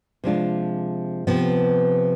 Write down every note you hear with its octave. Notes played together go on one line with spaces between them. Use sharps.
C3 F3 G#3 D4 F4
C3 F3 B3